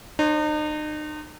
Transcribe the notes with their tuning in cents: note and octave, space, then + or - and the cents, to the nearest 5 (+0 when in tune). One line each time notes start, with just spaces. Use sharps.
D#4 -40 C5 +35